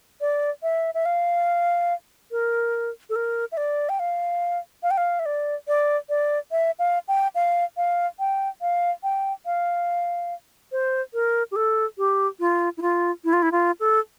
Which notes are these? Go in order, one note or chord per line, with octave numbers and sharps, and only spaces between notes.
D5
E5
E5
F5
A#4
A4
A#4
E5
D5
G5
F5
F5
G5
F5
E5
D5
D5
D5
E5
F5
G5
F5
F5
G5
F5
G5
F5
C5
A#4
G4
A4
G4
F4
E4
F4
E4
F4
E4
F4
A4